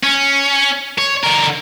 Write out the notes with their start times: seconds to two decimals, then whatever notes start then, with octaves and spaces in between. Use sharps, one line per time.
0.04 C#4
0.98 C#5
1.24 D3 A#4